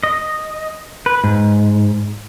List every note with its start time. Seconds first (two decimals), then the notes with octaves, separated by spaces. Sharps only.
0.03 D#5
1.06 B4
1.24 G#2